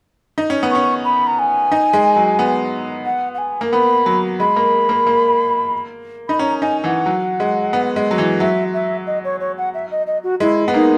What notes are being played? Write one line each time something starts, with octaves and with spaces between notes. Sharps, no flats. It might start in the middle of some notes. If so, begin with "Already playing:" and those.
D#4
C#4
B3
C#4 C#6
B5
A#5
G#5
D#4
G#3
F#3
B3
F#5
F#5
G#5
A#3
B3 B5
F#3
G#3 B5
A#3
A#3
A#3
D#4 B5
C#4 A#5
D#4 G#5
E3 F#5
F#3
G#3
B3
G#3
F#3
E3
F#3 E5
E5
D#5
C#5
C#5
F#5
E5
D#5
D#5
F#4
G#3 E4
B3
A#3 D#4